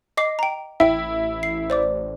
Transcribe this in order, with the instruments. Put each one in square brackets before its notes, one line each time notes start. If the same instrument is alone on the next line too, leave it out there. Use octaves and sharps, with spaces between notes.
[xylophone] D#5 D6 C7
G5 A#5
[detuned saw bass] A1 [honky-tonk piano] E4 [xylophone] E5 G5
[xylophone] C7
C5 D5 D6